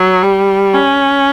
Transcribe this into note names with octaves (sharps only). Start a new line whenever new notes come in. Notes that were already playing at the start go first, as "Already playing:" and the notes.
Already playing: F#3
G3
C#4